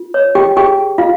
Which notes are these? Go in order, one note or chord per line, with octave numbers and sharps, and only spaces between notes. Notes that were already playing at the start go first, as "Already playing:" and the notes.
Already playing: F4
C#5
G4 G5
G4 G#4 G5
F4 F5